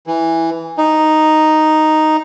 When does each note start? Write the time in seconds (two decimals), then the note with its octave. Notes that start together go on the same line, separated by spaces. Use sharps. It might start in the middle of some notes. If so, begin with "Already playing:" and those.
0.07 E3
0.78 D#4